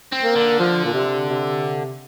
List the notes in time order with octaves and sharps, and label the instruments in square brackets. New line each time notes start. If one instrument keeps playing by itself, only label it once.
[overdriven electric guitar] C4
[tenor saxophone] A#3
[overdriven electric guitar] D3
[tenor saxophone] F3
A#2
C3
C3